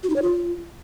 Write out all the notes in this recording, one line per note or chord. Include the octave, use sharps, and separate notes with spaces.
F#4
D#4
C#5
F4